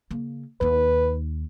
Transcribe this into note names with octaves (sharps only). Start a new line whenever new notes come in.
C#3 A#3
D#2 D#4 B4